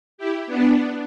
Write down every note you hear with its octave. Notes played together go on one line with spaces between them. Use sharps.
E4 G4
B3 D4